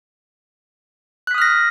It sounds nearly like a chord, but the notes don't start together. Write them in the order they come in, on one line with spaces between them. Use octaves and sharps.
F#6 B6 D#6 F6 A#6